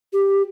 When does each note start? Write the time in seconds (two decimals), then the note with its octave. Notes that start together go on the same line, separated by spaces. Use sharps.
0.13 G4